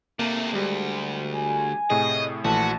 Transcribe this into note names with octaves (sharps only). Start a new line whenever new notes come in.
C3 A3 A#3
D2 G3 G#3
G#5
A2 C3 G#4 D#5
A#1 E3 A3 F#4 A5